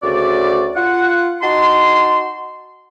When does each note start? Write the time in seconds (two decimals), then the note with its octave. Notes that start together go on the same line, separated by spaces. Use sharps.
0.03 D2 C#3 F#4 D5
0.75 F4 F#5
1.42 D#4 F#4 A5 C6